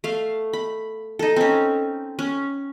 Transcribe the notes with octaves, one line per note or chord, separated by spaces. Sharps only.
A3 F5
B5
D#4 A4
C4 C#4
C#4